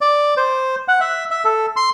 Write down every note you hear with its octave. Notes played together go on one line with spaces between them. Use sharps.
D5
C5
F#5
E5
E5
A4
C6